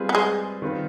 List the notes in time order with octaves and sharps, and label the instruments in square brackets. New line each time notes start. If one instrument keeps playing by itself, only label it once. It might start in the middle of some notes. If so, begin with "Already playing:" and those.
Already playing: [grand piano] G3 C4 F4 G#4 B4
[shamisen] B3
G#3
[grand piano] D#3 G3 C4 F4 B4